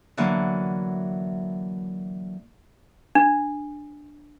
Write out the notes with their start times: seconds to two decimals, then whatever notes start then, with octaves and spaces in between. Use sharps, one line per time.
0.17 D3 E3 F#3 A#3
3.15 D4